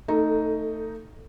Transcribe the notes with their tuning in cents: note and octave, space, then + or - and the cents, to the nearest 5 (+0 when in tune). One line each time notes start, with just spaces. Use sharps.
A3 +25 D#4 +0 A4 +0